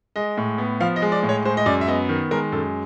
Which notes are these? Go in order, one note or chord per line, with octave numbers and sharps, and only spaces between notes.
G#3 D#5
A2
B3
F3 F5
D#5
G#3
D5
A2
C#5
G#3 C5
D#5
F#2 D5
E5
B3 D#5
D#3
G#3 A#4
F#2 A4